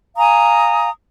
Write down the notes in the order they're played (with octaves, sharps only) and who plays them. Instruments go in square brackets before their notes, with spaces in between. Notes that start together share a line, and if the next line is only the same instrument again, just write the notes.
[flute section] F5 G#5 A#5 D#6